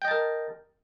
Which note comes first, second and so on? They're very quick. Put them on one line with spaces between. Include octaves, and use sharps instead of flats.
G5 D#5 A5 A#4